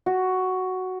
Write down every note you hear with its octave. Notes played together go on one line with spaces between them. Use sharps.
F#4